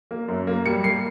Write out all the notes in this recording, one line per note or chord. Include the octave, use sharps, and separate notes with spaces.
A#3
F#2
A#3
G3 C#7
A#3 C7